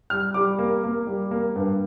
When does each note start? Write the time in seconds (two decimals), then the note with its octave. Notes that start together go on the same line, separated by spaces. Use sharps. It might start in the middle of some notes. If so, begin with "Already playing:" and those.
0.10 G3 F6
0.34 G3 D6
0.59 A#3
0.84 A#3
1.07 G3
1.31 A#3
1.56 G2